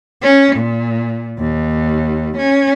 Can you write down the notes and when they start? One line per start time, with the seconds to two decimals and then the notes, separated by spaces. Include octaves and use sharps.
0.22 C#4
0.56 A#2
1.39 D#2
2.37 C#4